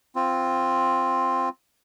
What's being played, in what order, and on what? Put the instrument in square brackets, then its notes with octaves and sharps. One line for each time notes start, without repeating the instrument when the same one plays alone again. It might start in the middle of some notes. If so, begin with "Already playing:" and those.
[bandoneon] C4 F4